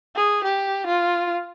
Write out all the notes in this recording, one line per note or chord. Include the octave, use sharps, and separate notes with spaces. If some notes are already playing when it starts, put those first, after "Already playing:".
G#4
G4
F4